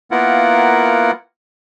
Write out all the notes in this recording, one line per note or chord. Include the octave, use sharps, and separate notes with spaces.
A#3 B3 E4 F4 A#4 F#5